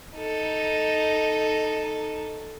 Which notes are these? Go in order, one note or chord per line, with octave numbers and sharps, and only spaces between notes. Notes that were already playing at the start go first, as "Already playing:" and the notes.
D#4 A4